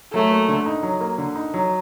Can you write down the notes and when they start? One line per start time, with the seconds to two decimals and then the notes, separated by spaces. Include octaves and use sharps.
0.13 F#3 A3
0.31 A#3
0.48 D3
0.66 D#4
0.83 F#3
1.01 A#3
1.18 D3
1.36 D#4
1.54 F#3